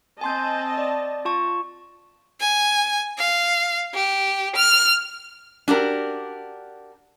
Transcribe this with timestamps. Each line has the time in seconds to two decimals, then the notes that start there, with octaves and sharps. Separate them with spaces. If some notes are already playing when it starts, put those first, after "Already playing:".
0.21 C4 D#5 G#5 A5 C6 G6
0.78 D5
1.25 F4 A5 C#6
2.40 G#5
3.18 F5
3.94 G4
4.56 F6
5.68 D4 F#4 G4 A#4